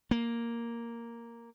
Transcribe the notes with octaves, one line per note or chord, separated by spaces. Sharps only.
A#3